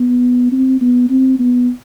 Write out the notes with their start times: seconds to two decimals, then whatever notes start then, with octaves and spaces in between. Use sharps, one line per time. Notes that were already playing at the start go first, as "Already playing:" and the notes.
Already playing: B3
0.52 C4
0.81 B3
1.10 C4
1.39 B3